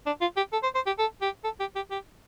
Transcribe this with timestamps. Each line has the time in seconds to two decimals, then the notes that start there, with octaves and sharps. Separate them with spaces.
0.06 D4
0.21 F4
0.37 G4
0.53 A4
0.63 C5
0.75 C5
0.86 G4
0.99 A4
1.22 G4
1.44 A4
1.60 G4
1.76 G4
1.91 G4